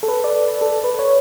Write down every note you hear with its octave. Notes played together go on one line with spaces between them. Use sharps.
A4
B4
D5
A4
B4
C#5